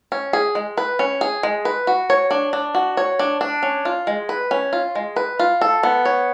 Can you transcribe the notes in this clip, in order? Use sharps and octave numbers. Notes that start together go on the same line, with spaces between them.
C#4
G#4
G#3
B4
C#4
G#4
G#3
B4
F#4
C#5
D4
D4
F#4
C#5
D4
D4
C#4
F4
G#3
B4
C#4
F4
G#3
B4
F4
A4
B3
C#5